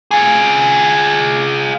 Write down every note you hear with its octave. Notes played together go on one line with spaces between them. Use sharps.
F4 G#4